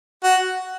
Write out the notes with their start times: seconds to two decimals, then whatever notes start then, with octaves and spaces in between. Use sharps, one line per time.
0.23 F#4